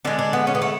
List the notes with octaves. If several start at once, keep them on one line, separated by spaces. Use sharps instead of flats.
D3 G#3 D4
D4
B3
C#4
B3
A3